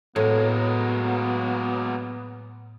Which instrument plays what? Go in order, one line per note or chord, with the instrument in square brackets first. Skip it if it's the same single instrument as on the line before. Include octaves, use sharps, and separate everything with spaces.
[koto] A2 [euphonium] F#3 [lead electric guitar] G#3 A#3 [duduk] B3